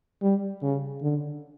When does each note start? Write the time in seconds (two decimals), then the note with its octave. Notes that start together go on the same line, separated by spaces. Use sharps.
0.23 G3
0.63 C#3
1.02 D3